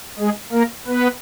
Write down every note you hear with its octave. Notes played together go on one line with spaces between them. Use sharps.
G#3 G#4
A#3 A#4
B3 B4